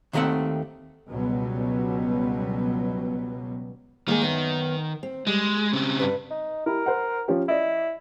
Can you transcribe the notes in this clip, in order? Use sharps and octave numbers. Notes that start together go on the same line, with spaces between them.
D#2 D#3 G#3 A3 C4 F#5
C#2 B2 F#3 G3 B3
D#3 G#3 A#3 D#4
F#2 B3
C4
G3 G#3
C#3 C4
G2 B4
D#4
E4 G4 A#4
C5 F#5
F3 C#4 G4
E4 D5 D#5